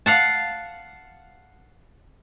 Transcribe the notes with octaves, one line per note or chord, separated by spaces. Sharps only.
F5 F#5 A5